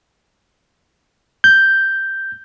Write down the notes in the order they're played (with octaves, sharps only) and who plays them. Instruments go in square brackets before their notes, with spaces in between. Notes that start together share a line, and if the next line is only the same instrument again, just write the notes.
[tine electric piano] G6